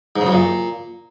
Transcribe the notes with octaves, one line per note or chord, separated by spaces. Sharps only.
G#2
C#3
F#2
A#2